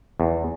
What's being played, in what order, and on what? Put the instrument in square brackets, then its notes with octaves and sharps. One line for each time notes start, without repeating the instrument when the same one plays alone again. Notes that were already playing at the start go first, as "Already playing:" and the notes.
[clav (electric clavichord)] E2